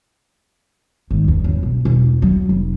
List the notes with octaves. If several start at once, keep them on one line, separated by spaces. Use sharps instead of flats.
G#1
E2
F#1
B2
E1
F#3
F1